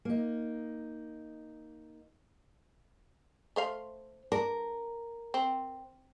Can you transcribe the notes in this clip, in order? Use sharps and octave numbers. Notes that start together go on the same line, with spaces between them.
A#3 D#4
A3 C5 F5
D4 A#4
C4